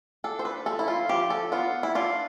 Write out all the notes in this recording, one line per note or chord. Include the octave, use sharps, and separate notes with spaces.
D4 A4
C5
B4
F3 A4
E4
F4
F3 G4
A4
B3 F4
E4
D4 F4